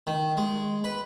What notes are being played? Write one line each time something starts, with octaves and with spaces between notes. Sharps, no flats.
D#3
G#3
B4